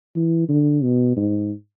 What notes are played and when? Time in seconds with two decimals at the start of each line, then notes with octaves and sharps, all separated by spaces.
0.16 E3
0.49 D3
0.83 B2
1.16 G#2